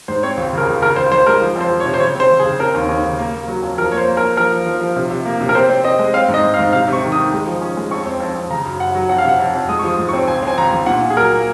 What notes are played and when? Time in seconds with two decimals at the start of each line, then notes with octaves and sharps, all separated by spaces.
0.08 G#2 C5
0.23 C4 C#5
0.37 C#2
0.53 C#3 A#4
0.63 G#4
0.67 C#2
0.82 C#3 A#4
0.96 C#2 C5
1.11 C#2 C5
1.26 G#3 A#4
1.41 F3
1.56 F2 C5
1.71 F3
1.80 C#5
1.85 C3
1.94 C5
2.00 C#3 C#5
2.15 C4 C5
2.30 C#3
2.40 G#4
2.44 C#3
2.59 C4 A#4
2.74 D#2
2.89 D#2
3.04 C#3
3.18 A#3
3.34 A#3
3.48 F#3
3.62 F2
3.78 F3 A#4
3.92 A#3 C#5
3.98 C5
4.08 A#3
4.17 A#4
4.22 A#3
4.37 F3 A#4
4.52 F3
4.66 F3
4.81 F3
4.96 C3
5.11 C3
5.25 A#3
5.41 C3
5.49 A#4
5.55 C4 C5
5.70 C4
5.84 C4 D#5
5.99 G#3
6.14 C4 F5
6.28 G#2
6.34 D#5
6.44 G#2
6.54 F5
6.59 G#2
6.73 C3 F5
6.88 C3 C#6
7.03 D#3
7.12 D#6
7.17 D#3
7.33 G#3
7.47 F3
7.62 C#4
7.77 G#3
7.91 F2 C#6
8.06 C4
8.20 F2
8.36 F2
8.50 C#3 A#5
8.65 F#2
8.80 F#2 F#5
8.95 F#3
9.09 F2 F#5
9.18 F5
9.24 C3 F#5
9.39 F2
9.54 F2
9.69 G#3 D#6
9.79 C#6
9.84 F3 D#6
9.98 G#2
10.09 C#6
10.13 C4
10.28 C#2 G#5
10.43 C4 G#5
10.58 C#2 A#5
10.72 C#2
10.86 A#2 F#5
11.01 A#2
11.10 G#4
11.16 F#3 A#4
11.32 A#3